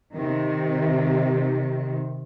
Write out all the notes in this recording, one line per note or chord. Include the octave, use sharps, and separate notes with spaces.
C3 D#3